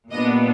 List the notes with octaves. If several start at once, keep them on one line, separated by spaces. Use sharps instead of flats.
A#2 G3 B3 D4 D#5